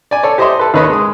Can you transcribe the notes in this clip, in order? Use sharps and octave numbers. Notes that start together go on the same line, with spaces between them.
D5 G#5
A4 C#5 D5
G4 C5 D#5 E5 C6
A4 B4
D#2 C#4 B4 D#5 B5
G#3 D#6